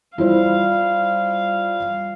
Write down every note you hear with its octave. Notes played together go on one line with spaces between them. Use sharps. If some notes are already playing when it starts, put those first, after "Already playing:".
G3 E4 F4 C5 F5